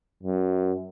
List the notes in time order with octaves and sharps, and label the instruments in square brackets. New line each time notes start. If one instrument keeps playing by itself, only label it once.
[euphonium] F#2